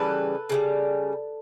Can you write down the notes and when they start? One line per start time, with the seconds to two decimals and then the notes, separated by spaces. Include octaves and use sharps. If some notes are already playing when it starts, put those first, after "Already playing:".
Already playing: C#3 E3 G3 A4 B4
0.50 C#3 E3 G3